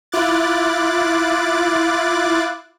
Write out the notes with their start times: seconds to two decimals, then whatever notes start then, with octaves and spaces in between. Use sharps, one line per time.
0.12 E4 F4 D6 F#6 A6